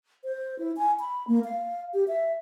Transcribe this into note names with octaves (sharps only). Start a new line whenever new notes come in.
C5
E4
G#5
B5
A#3
F5
G4
E5